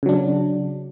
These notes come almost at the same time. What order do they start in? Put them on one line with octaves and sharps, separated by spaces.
C#3 F#3 D4